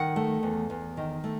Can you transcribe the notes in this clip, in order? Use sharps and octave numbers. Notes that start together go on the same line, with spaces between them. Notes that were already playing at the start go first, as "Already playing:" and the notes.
Already playing: D#3 F#5
A3
E2
E2
D#3
A3